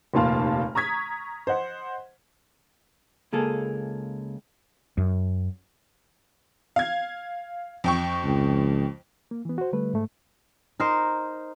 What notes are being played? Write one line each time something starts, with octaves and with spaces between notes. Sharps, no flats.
F1 D#2 A#2 F4 A5 F6
A#5 C#6 D#6 G#6 B6
C5 D#5 F#5
C#2 A#3 G#4 A4
F#2
F5 G#6
F2 G5 C#6
C#2
A#3
E3 B3
F#4 C5
D3 G3 A3 B4
G#2 A3
D#4 A#4 C5